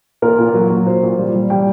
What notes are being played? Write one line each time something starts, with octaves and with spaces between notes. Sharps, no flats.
A#2 A#4
A#2
F#3
F#3
A#2 C5
A#2
G3
G3
G3 G5